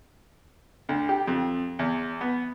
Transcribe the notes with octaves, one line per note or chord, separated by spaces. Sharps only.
D2
G4
F2
E2
B3